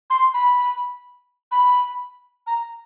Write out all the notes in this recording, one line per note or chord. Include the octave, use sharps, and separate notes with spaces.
C6
B5
B5
A#5